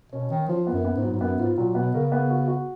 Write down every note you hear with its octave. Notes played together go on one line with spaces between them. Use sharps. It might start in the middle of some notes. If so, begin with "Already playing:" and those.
B2 C#4
D#3 C#4
F3 F4
B3
F#2
B3
G#2
F#3
G#2
F#2 B3
G#2 F4
A#2 F#3
B2 B3
C#3 A#4
B3
F#4
F#4